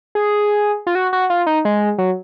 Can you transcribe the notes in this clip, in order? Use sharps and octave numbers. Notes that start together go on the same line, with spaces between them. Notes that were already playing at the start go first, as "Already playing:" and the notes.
G#4
F4
F#4
F#4
F4
D#4
G#3
F#3